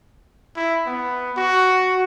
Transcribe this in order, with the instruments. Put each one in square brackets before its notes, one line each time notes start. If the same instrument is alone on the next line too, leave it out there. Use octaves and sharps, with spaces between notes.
[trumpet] E4
B3
F#4